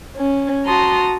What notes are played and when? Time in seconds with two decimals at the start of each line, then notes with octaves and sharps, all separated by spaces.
0.15 C#4
0.66 F#4 A5 A#5 C6 D#6